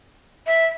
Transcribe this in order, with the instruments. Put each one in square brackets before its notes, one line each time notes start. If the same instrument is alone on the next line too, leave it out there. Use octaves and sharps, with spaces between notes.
[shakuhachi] E5